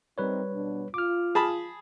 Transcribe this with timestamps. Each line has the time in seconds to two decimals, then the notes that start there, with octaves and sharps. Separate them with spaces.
0.18 G3 C4 D#4 A#4 B4 C#5
0.53 B2 D4
0.94 F4 D6 F6
1.35 G#4 A5 B5